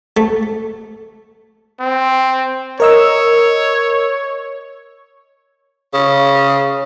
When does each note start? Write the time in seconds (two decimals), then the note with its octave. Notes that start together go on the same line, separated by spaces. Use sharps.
0.17 A3
1.80 C4
2.80 A#4 C#5 D#5 E6
5.94 C#3